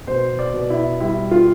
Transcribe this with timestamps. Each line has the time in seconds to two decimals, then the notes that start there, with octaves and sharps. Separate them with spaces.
0.07 B2 C5
0.39 D5
0.54 B2
0.70 E4
1.00 G3 E4
1.31 F4